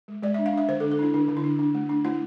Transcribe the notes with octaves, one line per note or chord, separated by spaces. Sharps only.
G#3
G#3 D5
D4 E5
F5
D4 E5
D3 C5
A4
D4
A4
D4 E4
D3 D4
D3
E4
D4
D4
A3
D4
A3 E4